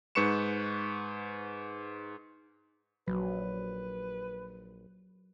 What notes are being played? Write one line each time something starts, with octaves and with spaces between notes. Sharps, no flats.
G#2 B4 C#6 C#7 E7
A#1 F#3 B4